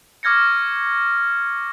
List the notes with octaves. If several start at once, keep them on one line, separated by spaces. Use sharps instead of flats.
C#6 D6 F6 G#6 A#6 C#7